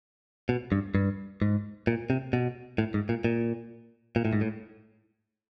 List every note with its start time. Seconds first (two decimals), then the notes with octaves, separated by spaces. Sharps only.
0.49 B2
0.72 G2
0.95 G2
1.42 G#2
1.87 A#2
2.10 C3
2.33 B2
2.78 A2
2.94 G#2
3.09 A#2
3.24 A#2
4.16 A#2
4.25 A2
4.33 G#2
4.41 A2